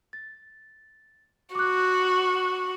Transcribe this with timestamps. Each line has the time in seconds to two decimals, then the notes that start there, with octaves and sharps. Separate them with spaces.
0.13 A6
1.55 F#4 D6 F#6